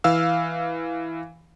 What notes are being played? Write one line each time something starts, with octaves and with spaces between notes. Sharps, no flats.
E3 F5 E6